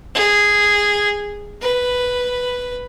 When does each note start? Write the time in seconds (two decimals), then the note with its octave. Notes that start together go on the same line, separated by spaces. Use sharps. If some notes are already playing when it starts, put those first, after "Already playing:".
0.15 G#4
1.61 B4